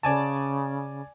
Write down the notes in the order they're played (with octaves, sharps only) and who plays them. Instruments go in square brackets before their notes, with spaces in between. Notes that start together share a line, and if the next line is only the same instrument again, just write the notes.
[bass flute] C#3 [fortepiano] D5 G#5 A5